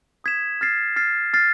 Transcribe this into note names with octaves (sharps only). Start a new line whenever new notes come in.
D#6 G#6 B6 E7
F6 A6 C7
F6 A6 C7
F6 A6 C7